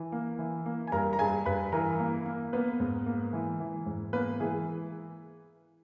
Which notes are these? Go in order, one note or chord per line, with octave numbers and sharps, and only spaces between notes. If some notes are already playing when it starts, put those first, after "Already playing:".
Already playing: E3
A#3
E3
A#3
G#5
G2 A#4 A#5
A#5
G2 G#4 G#5
G2 B4 B5
E3 A#4 A#5
A#3
A#3
A#3 B3 B4
G#2
A#3
E3
E3
G#2
A#3 B3 B4
E3 G#4